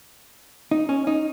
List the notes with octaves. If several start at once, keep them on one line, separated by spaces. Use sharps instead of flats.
D#4
C#4
D#4